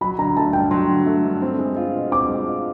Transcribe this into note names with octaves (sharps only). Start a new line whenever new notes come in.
F#3 B5
D3 A#5
A3 A5
G2 G5
F#3 C6
D3
A3
G2
C4
G#3
F4
B2
C4 D6
G#3
F4